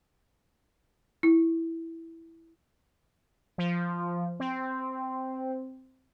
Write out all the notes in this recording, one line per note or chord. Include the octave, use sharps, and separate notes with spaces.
E4
F3
C4